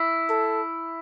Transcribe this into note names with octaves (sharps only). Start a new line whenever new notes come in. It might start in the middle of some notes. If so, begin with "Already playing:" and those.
Already playing: E4
A4